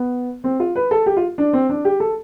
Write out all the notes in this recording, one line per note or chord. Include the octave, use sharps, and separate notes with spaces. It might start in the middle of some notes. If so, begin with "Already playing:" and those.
Already playing: B3
C4
F4
B4
A4
G4
F4
D4
C4
D4
G4
A4